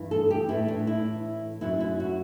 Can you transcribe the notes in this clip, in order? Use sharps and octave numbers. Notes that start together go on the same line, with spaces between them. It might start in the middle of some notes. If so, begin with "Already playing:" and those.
Already playing: G2 E3
A4
G4
A2 E3 E4
D4
E4
F#2 F#3 E4
E4
F#4